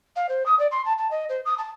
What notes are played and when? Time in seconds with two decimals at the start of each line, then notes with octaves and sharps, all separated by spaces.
0.15 F5
0.28 C5
0.45 D#6
0.59 D5
0.71 C6
0.85 A5
0.98 A5
1.11 D#5
1.29 C5
1.45 D#6
1.58 A5